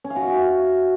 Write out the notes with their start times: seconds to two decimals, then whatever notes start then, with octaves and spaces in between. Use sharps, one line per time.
0.04 C#4
0.10 F5
0.16 F#4
0.22 E5
0.28 F#4